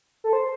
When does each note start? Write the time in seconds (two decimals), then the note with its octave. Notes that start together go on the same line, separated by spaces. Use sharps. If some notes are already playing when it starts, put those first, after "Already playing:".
0.24 A4
0.33 C5